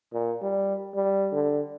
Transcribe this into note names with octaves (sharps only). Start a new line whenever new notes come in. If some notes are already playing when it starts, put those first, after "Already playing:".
A#2
G3
G3
D3